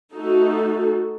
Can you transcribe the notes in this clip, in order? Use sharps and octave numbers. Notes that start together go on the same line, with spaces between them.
A3 D#4 F#4 A4